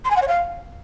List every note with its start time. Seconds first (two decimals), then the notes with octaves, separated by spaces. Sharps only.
0.05 C6
0.11 G#5
0.16 F#5
0.22 C#5
0.28 F5